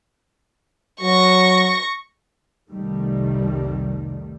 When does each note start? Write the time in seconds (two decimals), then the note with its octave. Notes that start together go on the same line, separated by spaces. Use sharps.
1.01 F#3 C#6 A#6
2.70 F1 C2 D#3 G3 A3